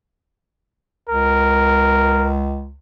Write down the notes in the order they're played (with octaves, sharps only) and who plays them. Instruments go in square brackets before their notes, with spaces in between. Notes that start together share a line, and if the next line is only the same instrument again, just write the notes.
[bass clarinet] C#2 [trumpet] A#4